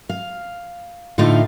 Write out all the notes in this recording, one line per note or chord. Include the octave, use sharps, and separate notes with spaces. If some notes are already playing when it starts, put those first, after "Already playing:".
F5
A2 D3 A3 D#4 F4 F5